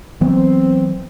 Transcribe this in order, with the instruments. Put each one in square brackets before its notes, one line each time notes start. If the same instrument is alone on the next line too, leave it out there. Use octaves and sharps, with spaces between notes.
[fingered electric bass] E3 F#3 B3 [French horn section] C4